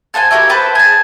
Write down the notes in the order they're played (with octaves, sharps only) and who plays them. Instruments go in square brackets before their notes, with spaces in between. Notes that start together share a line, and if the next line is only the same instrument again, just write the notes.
[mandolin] A4 C5 F#5 G#5
E4 F#4 G4 A#4
B4 C5 G5 A5
G#4 A5